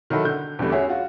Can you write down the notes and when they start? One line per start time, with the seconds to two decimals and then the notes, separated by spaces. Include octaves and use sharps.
0.10 D#3 F#3 D#4 E4 F#4 A4
0.25 D3 G6
0.59 E2 D3 E3 G3 A3
0.72 C#4 F#4 G#4 E5
0.89 F4 F#4